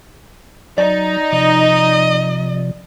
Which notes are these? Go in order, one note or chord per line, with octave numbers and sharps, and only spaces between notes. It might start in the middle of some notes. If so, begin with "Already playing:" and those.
F#3 D#4 D5
C3 F3 D#5